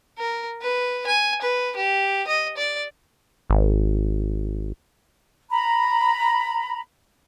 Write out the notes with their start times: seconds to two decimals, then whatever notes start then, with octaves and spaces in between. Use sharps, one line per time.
0.18 A#4
0.62 B4
1.07 G#5
1.42 B4
1.76 G4
2.27 D#5
2.57 D5
3.50 G#1
5.50 A#5 B5